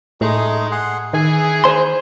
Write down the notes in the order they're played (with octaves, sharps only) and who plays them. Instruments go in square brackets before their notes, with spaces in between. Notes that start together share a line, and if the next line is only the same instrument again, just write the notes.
[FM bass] A2 [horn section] G#3 [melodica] A3 D#4
[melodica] G#4 F#5 C6
[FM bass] D#3 [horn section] E3 G#4 [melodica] G#5
[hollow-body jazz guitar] C5 C6